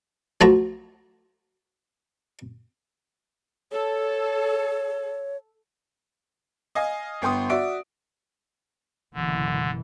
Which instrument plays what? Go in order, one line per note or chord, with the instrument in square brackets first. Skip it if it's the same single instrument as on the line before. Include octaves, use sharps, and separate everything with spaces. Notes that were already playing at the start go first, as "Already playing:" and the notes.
[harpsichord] F3 A3 F#4 A#5
[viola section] A4 [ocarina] C#5
[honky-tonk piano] D#5 F5 G#5
G1 B3 G5 C6 D#6
F#4 D5 E5 D7
[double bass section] F#1 B2 E3 [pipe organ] D3